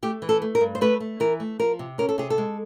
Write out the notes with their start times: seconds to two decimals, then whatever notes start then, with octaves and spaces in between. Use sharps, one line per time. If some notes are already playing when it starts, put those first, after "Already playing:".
0.03 A3 G4
0.22 E3
0.29 A4
0.42 A3
0.55 A#4
0.61 G2
0.75 C5
0.81 A3 B4
1.00 A3
1.20 E3 A#4
1.40 A3
1.60 F3 A#4
1.79 C3
1.98 C#4 A#4
2.09 A4
2.18 C3 G#4
2.30 A4
2.38 G#3